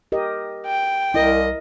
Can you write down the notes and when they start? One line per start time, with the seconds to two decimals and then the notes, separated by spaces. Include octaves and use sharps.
0.12 G4 A#4 D#5
0.66 G5
1.14 C2 E4 A#4 D#5